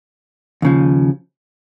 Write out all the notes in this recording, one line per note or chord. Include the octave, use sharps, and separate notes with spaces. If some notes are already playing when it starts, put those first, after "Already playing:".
D#2 C#3 F3